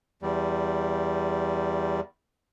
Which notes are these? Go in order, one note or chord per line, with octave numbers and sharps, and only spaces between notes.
E2 G3